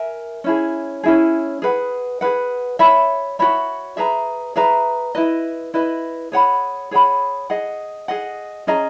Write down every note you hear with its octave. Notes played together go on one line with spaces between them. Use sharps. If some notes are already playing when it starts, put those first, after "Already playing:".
Already playing: A#4 E5 G#5
C#4 E4 G#4
C#4 E4 G#4
G#4 B4 F#5
G#4 B4 F#5
F#4 C#5 E5 B5
F#4 C#5 E5 B5
G#4 B4 E5 A#5
G#4 B4 E5 A#5
E4 B4 D#5
E4 B4 D#5
G#4 C#5 F#5 B5
G#4 C#5 F#5 B5
G#4 D#5 F#5
G#4 D#5 F#5
C#4 G#4 D#5 A#5